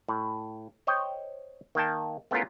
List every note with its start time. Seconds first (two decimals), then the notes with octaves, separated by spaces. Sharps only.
0.08 A2
0.87 C5 C#5 D#5 G5
1.75 D#3 A#3 G5 A5
2.31 A3 B3 C#4 E4 F4 A#4